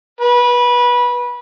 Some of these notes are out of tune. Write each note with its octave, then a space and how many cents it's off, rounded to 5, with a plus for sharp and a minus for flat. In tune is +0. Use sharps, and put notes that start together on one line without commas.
B4 -20